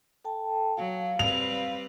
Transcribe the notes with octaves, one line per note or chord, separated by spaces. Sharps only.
A4 G5 A5
F#3 F5
G3 C4 B4 F7